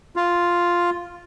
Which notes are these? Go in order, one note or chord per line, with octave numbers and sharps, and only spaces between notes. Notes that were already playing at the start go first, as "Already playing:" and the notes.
F4